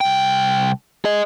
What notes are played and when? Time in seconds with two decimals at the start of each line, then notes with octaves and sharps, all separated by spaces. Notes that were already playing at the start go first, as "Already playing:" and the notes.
0.01 C2 G5
1.05 G#4 D#5